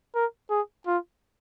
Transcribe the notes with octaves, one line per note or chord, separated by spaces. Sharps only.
A#4
G#4
F4